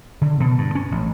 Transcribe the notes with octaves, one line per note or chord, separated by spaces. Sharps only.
D3
B2
G2
C#4
A1